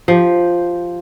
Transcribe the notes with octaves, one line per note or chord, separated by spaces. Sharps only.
F3 G4